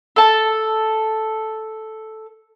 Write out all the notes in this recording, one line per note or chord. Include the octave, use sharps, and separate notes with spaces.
A4 A5